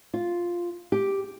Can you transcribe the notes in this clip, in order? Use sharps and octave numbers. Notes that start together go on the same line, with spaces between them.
F4
G4